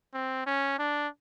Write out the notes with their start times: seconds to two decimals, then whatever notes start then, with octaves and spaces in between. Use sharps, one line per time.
0.14 C4
0.46 C#4
0.79 D4